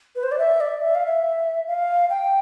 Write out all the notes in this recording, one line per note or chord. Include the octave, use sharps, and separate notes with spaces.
B4
C5
D5
E5
D5
E5
F5
E5
F5
G5